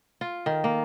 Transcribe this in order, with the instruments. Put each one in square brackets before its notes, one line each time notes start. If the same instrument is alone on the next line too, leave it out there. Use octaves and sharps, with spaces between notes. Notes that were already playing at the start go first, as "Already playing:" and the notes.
[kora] F4
D#3
A#3